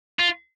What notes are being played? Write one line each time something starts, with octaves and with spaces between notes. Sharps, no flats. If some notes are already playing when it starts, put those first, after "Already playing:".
F4